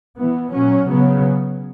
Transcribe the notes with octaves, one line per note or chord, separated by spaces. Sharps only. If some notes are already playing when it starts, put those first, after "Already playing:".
E3 B3
A#2 F#3 C#4
C#3 F#3 B3